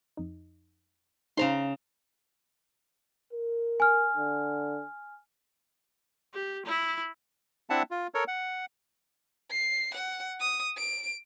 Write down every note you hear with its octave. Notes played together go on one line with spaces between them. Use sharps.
F2 D#4
C#3 D#4 G#4 C5 A#5 C6
A#4
G#5 F6
D3
G4
E4
C4 D4 E4 E5 F#5 A5
F4
A4 A#4 C#5
F#5
C7
F#5
D#6
D7